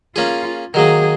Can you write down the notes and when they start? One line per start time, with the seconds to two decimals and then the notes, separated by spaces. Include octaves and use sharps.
0.16 A#3 C#4 F4 G#4
0.74 D#3 F#3 A#3 G#4